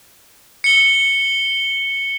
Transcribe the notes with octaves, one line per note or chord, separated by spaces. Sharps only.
C#7 G7